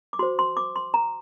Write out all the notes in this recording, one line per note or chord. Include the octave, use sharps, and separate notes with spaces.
D6
F#4 C5 C6
C6
D6
C6
A#5